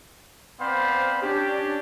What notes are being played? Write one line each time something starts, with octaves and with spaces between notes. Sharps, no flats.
B3 C4 C5 D5 F5 B5
C#4 D4 G4